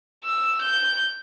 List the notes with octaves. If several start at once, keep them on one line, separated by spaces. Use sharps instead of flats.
E6
G6